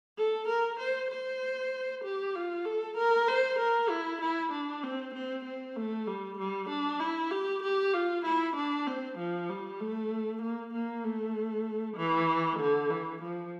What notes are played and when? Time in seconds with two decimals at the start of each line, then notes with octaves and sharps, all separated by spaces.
0.18 A4
0.48 A#4
0.80 C5
1.11 C5
2.04 G4
2.35 F4
2.65 A4
2.97 A#4
3.28 C5
3.59 A#4
3.90 E4
4.22 E4
4.52 D4
4.83 C4
5.14 C4
5.45 C4
5.76 A3
6.07 G3
6.38 G3
6.69 D4
7.00 E4
7.31 G4
7.63 G4
7.94 F4
8.25 E4
8.56 D4
8.87 C4
9.18 F3
9.49 G3
9.80 A3
10.42 A#3
10.74 A#3
11.05 A3
11.97 E3
12.60 D3
12.90 E3
13.22 F3